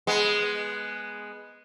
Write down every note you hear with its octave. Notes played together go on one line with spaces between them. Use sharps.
G#3 B3